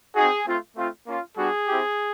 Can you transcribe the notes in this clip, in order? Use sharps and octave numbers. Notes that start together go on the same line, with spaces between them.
C4 D#4 F#4 G#4
A3 C4 F4
A3 C4 F4
A#3 C#4 F4
G3 B3 D4 F#4 G#4
C4 E4 G4